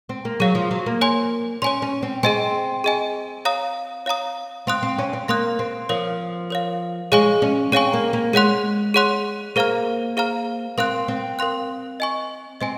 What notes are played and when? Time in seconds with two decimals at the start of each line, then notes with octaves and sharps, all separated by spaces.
0.09 C4
0.25 A#3
0.40 F#3 G#4 C#5 F5
0.55 F3
0.71 F#3
0.86 A#3
1.01 C#5 G#5 C6
1.62 C#4 C#5 G#5 C6
1.82 C#4
2.03 C4
2.23 C4 G#4 D#5 G#5
2.84 G#4 D#5 G#5
3.45 C#5 F5 A#5 D#6
4.06 C#5 F5 A#5 D#6
4.67 C4 F5 C6 D#6 F#6
4.83 C4
4.98 C#4
5.13 C4
5.28 A#3 F5 C6 D#6 F#6
5.59 C4
5.89 F3 A#4 C#5 F5
6.50 A#4 C#5 F5
7.12 G#3 G#4 C#5 F5 G#5 C#6
7.42 C#4
7.72 C4 G#4 C#5 F5 G#5 C#6
7.93 A#3
8.13 A#3
8.33 G#3 G#4 C#5 F#5 C6 F#6
8.94 G#4 C#5 F#5 C6 F#6
9.56 A#3 G#4 C5 F5 A#5 F6
10.17 G#4 C5 F5 A#5 F6
10.78 C4 A#4 F5 C6 F#6
11.08 C4
11.39 A#4 F5 C6 F#6
12.00 D#5 G#5 C#6
12.61 C4 D#5 G#5